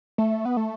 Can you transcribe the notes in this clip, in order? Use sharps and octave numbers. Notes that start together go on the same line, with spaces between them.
A3
B3
A3